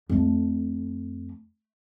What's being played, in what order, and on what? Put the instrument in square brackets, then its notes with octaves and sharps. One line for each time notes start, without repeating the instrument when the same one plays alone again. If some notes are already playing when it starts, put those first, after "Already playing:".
[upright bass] F2 A3